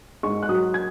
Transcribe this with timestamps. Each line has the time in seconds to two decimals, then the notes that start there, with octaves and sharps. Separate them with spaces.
0.23 G#2 C#6
0.43 F#6
0.49 F#3 D#6
0.74 G#6